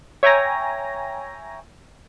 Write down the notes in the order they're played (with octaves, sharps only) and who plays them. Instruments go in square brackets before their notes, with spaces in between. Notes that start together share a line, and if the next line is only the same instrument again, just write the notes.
[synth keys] C#5 E5 G5 G#5 A#5 A#6